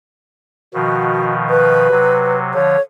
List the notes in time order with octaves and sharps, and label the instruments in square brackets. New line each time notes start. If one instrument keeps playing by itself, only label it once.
[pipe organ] B2 D#3 F3 [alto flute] F#4
[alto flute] B4
[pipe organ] C3 F#3
[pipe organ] D3 F3 [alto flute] C#5